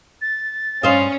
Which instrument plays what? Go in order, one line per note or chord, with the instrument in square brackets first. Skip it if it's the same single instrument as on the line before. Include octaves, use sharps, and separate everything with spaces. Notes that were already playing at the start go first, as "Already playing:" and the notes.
[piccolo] A6
[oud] G2 C5 D#5 [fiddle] C#4 [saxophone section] F5